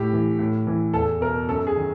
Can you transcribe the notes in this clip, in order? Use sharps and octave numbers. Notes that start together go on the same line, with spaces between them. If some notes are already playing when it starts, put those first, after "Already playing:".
Already playing: A2 G4
E3
A2
E3
E2 A4
B2 A#4
F#2 A4
G#4
D#3